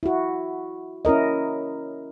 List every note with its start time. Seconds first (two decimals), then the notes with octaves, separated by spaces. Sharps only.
0.03 E4 F#4
1.05 C#4 E4 A#4 D#5